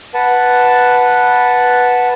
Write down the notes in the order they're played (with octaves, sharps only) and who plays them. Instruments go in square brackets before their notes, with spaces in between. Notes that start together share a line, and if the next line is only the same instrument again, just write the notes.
[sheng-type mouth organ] B4 F#5 A5